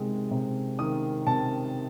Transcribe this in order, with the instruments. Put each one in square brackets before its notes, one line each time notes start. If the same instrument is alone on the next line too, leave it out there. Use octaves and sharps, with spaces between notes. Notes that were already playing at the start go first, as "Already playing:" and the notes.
Already playing: [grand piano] C3 D#3 G#3
C3
D#3 D#6
C3 A5